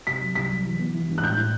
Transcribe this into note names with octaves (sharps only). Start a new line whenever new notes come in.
C3 B6
F#3
C2 B6
F#3
E3
B3
E3
G2
F#6
A2 G6
A2